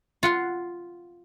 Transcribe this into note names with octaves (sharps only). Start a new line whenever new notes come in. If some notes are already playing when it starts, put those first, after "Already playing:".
F4 F#5 C6